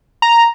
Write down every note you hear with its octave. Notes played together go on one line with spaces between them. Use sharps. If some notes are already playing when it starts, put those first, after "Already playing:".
A#5